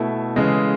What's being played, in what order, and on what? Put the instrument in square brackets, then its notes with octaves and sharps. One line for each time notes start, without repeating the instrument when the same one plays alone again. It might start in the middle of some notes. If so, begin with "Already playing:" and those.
Already playing: [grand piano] B2 A3 E4
C#3 E3 G#3